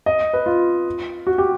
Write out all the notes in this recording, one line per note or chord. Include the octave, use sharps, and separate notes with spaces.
D#5
B4
F4
F#4
G4